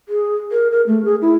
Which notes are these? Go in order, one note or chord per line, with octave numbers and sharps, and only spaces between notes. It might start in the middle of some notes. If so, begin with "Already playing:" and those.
G#4
A#4
A#4
A3
G#4
E4